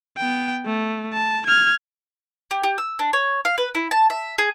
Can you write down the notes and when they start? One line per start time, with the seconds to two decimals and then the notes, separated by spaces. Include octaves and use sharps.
0.17 B3 G5
0.66 A3
1.13 A5
1.46 F6 G#6
2.51 G4
2.64 G4
2.78 E6
2.99 D4
3.13 C#5
3.45 F5
3.58 B4
3.75 E4
3.91 A5
4.10 E5
4.38 G#4